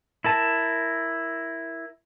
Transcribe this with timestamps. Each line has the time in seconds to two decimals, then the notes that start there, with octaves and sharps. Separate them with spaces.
0.25 E4 A#4 A5